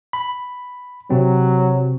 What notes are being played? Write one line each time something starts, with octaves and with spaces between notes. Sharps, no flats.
B5
C3 F#3 C4